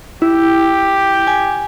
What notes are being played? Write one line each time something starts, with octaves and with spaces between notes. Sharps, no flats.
E4 G4
G#5